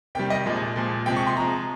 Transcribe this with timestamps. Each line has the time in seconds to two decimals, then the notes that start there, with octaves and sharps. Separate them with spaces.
0.15 C3 D#3 G3 G5
0.30 D#5
0.46 A#2 F3 G#3
0.76 A#2 F3 G#3
1.06 C3 F3 G#3 G5
1.16 C#6
1.27 C6
1.37 C3 F3 G#3 A#5